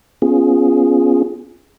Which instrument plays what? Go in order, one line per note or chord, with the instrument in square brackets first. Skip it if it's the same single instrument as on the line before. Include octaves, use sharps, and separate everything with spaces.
[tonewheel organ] B3 C#4 F4 G#4